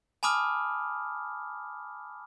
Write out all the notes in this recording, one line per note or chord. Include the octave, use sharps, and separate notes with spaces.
G#5 A5 B5 D6 D#6 F6